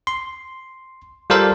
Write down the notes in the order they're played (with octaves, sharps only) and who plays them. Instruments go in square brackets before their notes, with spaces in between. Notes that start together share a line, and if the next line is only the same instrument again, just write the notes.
[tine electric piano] C6
G3 F4 A4 A#4 C5 F5